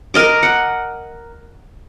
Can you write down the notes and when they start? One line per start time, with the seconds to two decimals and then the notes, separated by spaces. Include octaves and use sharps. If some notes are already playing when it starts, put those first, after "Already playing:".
0.14 A#4 D#5 D6
0.43 F#5